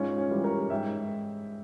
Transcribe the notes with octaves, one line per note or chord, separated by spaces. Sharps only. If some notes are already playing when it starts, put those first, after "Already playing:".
Already playing: G#2 C#4 F4
C#4 F4
E3 G3
A#4 C#5
G#2 E5 G5